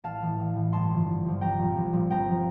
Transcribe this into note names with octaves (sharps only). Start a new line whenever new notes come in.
A1 F5 A5
A2 E3
A1
A2 E3
G1 A5 C6
G2 D3 F3
G1
G2 D3 F3
C2 G5 A#5
A#2 F3
C2
A#2 F3
G1 G5 A#5
F3